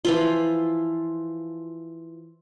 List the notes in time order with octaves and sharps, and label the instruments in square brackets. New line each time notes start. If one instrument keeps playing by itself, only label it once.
[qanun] E3 F3 F4